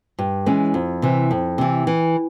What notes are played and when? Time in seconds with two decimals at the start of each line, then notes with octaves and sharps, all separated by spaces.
0.19 G2
0.46 E3 G#3 C#4
0.74 F2
1.02 C3 E3
1.31 F2
1.58 C3 E3
1.87 E3